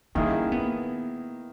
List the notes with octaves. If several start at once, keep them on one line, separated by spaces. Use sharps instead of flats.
D#3 A#3 C#4 E4 G#4
B3